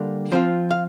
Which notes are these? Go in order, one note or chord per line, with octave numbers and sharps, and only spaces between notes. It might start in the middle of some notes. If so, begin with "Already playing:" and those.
Already playing: D3 G3 A#3 D4
F3 C4 F4 C5
F5